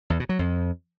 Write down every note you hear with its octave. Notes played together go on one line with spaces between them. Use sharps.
E2
B2
F#3
F2